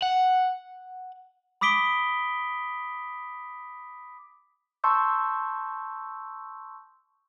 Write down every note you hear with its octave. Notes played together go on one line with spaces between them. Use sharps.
F#5
B5 D6 D#6 B6 D7 G7
A5 C6 C#6 E6 G6